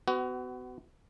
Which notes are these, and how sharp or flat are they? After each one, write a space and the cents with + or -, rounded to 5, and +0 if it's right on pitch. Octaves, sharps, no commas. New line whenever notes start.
B3 +35 F#4 +20